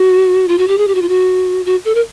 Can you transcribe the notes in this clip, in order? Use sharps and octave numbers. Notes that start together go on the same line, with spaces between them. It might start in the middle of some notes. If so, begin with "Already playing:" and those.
Already playing: F#4
F4
F#4
G4
G#4
G4
F#4
F4
F#4
F#4
A4
A#4